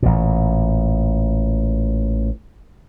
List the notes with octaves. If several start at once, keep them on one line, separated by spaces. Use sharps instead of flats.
A1 A#2